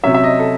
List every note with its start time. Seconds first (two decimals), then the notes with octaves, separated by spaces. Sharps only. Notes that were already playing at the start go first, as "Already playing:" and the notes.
0.03 C3 F#3 C#4 E5
0.14 E5
0.24 D#5
0.39 A4